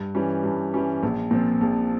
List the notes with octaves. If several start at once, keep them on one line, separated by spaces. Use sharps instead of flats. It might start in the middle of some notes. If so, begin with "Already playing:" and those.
Already playing: G2
E3 G3 C#4
G2
E3 G3 C#4
A#1
A#2 F3 C4
A#1